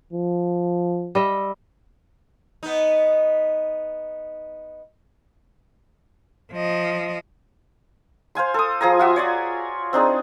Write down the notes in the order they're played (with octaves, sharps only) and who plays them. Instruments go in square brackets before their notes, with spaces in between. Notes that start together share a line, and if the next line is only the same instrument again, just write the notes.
[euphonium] F3
[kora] G3 D#5 E5
[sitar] B3 D#4
[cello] F3 D#5
[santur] C5 F5 G#5 C6
A4 D#6
F3 G#4 G#5 A#5
F4 F#4 E5
C#5 D5 G#5
C4 D4 D#4 G#4